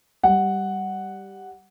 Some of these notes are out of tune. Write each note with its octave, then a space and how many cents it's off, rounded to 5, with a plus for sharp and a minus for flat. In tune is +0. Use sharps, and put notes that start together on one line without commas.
G3 +0 F#5 +0